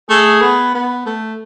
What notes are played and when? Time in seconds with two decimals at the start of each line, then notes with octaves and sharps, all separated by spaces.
0.09 A3 G#4
0.42 B3
0.75 B3
1.06 A3